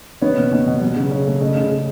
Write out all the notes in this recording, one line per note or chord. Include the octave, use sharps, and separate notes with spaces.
B3 C#5
B2
B2
B2
F#3
C#3
C#3
A3
C#3 D#5
C#3
C#3